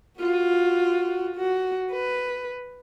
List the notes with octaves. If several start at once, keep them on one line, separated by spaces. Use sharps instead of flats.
F4 F#4
F#4
B4